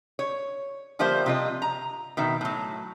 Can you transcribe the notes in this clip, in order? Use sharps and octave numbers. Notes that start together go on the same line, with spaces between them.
C#5
D3 F3 G3 A#3 C5 E5
C3 F4 D#5
A#5
B2 D#3 E5
A2 F#3